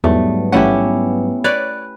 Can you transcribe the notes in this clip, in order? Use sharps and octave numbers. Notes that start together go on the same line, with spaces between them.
E2 G#2 F#3 G3 A3 B3
A1 A3 C#4 E4 G4 F#5
B4 C#5 D5 F#6